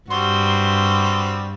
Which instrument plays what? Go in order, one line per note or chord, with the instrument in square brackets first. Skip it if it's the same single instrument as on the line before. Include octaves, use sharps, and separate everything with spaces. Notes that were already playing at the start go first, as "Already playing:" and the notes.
[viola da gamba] G2 [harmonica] G3 C4 F#4 [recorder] C6